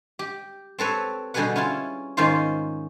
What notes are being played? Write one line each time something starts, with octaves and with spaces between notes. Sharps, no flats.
G4
C4 A4 B4 C#5
B2 D3 G3 G#4 B4 F#5
C#4 E4 F4 C#5
G#2 D#3 C#4 F4 C5 C6